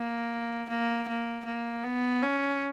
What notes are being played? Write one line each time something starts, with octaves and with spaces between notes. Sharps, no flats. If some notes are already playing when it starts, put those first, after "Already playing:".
Already playing: A#3
A#3
A#3
A#3
B3
C#4